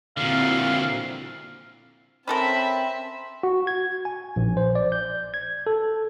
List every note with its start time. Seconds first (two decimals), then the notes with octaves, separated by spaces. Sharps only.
0.17 A#2 D3 C4 E4 F#4 F5
2.28 C4 C#4 A4 A#4 E5 A5 B5
3.43 F#4
3.67 G#6
4.05 G#5
4.36 A#1
4.57 C5
4.75 D5
4.92 G6
5.34 G#6
5.67 A4